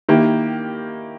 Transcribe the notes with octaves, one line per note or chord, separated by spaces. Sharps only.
D#3 A#3 E4 G4